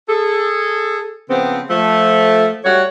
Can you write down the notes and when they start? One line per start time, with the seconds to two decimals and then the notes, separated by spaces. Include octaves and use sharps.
0.07 G#4 A4
1.28 C#3 F3 B3 C4
1.69 F3 A3
2.63 G3 A3 F#4 C#5